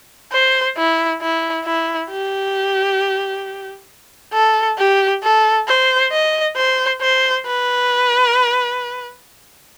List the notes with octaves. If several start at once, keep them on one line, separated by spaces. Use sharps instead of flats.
C5
E4
E4
E4
G4
A4
G4
A4
C5
D#5
C5
C5
B4